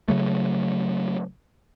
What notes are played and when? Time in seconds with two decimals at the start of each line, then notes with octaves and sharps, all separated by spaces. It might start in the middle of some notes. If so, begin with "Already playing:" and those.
0.08 C#3 F#3 A3